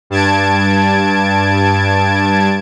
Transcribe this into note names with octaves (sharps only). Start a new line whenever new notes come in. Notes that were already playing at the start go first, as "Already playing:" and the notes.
G2 A5 G#6 D7